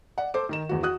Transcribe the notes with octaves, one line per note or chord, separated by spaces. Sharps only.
D5 F#5
A4 C5 D6
D#3 A#4 E7
E2 F#4
F#4 D#6 F#6